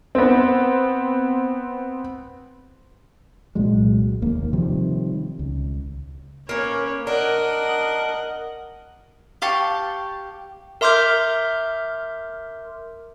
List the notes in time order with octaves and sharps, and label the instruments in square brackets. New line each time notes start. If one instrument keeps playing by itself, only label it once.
[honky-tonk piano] B3 C4
[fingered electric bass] C2 A#2 F#3 G#3
F1 D#2 A#3
C3 D#3 F3 G3
C#2
[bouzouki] A#3 C#4 [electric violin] B4 C#5
[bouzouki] D4 [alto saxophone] A#4 [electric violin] D#5 F#5
[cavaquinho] G4 F5 A5 C#6
[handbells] A#4 E5 C6 D6 F6 G6